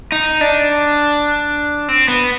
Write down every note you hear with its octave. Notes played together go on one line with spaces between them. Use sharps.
D#4
D4
C4
B3